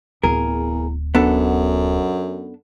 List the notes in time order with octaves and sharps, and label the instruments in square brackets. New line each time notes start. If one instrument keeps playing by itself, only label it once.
[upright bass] D1 [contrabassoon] E2 [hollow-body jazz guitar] G#4 A#4
[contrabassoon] F#2 [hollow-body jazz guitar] B3 D4 A4